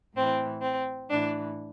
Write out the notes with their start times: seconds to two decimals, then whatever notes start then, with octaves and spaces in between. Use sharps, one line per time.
0.14 A2 E3 C4
0.61 C4
1.09 A2 E3 D4